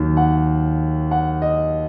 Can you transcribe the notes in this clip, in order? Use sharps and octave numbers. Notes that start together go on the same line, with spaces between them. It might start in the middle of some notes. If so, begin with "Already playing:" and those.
Already playing: D#2 D#3 F#3
F#5
F#5
D#5